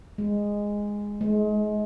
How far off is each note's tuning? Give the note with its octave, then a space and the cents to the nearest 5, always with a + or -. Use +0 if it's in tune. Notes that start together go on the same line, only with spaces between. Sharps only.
G#3 -10
G#3 +30